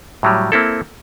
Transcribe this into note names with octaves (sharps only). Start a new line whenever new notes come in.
A2 F#3 G3
A#3 C4 E4 A4